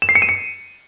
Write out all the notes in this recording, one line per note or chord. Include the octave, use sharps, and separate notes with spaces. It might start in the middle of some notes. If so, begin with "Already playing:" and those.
E7
C7
C#7
D#7
C#7